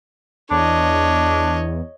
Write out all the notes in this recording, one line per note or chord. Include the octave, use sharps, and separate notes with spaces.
E2 D4 C#5 D#5